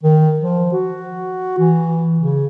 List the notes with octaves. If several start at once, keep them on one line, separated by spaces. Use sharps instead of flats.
D#3
F3
F#4
E3
C#3